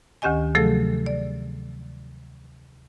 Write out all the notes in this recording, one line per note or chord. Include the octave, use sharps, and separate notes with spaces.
D2 D#3 C#4 G4 D#5 G#5
C3 F3 F#3 A3 G#4 A4
D5